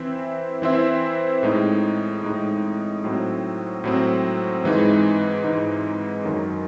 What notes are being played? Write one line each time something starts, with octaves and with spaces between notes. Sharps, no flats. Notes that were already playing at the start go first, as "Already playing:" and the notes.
Already playing: E3 C4 E4 C5 E5
E3 C4 E4 C5 E5
A2 G#3 D#4
A2 G#3 D#4
A2 F#3 C4
A2 F#3 C4
G#2 E3 G#3 D#4
G#2 E3 G#3 D#4
F#2 D#3 F#3